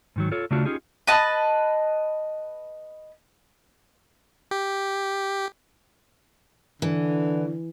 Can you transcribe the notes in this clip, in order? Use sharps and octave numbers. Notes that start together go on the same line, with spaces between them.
G#2 D#3 F#3
F4 A4 C#5
C#3 A3 D4 F4 F#4
C#4 D#4 F4 G4 G#4
B4 D#5 A5
G4
D3 E3